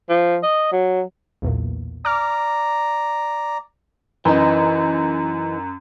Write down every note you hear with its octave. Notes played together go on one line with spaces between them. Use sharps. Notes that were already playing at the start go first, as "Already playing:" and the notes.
F3
D#5
F#3
B1 E2 A#2
D5 A#5 D6 F6
F#2 E3 D#4